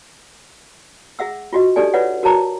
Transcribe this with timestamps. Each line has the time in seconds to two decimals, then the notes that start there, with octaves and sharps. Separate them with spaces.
1.19 G#4 E5 F#5 E6
1.53 F4 F#4 D#5
1.76 D4 D#4 G4 A4 D5 G#5
1.94 F4 B4 C#5 D5 E5 F#5
2.23 F#4 A#4 C#5 A5 A#5 D6